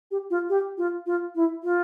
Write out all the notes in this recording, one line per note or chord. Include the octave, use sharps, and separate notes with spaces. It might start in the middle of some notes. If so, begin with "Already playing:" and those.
G4
F4
G4
F4
F4
E4
F4